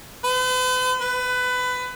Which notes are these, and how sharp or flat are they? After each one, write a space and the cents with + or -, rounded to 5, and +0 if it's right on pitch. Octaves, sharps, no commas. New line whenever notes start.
B4 +45
B4 +20